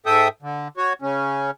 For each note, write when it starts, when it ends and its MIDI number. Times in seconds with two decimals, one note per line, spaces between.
0.06 0.28 44
0.06 0.28 69
0.06 0.28 76
0.06 0.28 79
0.06 0.28 87
0.42 0.68 50
0.77 0.93 66
0.77 0.93 73
1.02 1.51 49
1.02 1.51 61